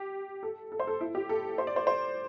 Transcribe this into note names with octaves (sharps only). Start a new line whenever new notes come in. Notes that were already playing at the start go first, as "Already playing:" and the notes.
Already playing: G4
A4
A4
C5
A4
E4
G4
A4
C5
D5
C5
C5